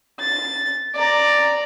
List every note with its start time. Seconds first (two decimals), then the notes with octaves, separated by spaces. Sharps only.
0.19 A6
0.94 D5 A#5